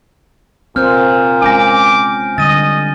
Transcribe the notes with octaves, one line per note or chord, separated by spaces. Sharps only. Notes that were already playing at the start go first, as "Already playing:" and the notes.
A#2 C4 C5 F6 G6
G#3 C#4 F4 G#5 D6 G6 A#6
D3 G3 D#5 A6 D#7